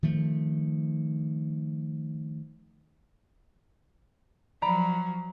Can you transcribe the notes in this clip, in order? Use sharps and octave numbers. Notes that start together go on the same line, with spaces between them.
D#3 F3 A3
F3 F#3 D5 A#5 B5